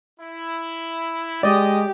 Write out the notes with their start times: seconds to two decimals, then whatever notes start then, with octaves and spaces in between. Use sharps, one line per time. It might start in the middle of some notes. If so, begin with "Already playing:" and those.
0.19 E4
1.43 G#3 G4 D5 D#5